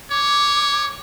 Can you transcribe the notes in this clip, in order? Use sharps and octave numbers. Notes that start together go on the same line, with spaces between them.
C#5 D6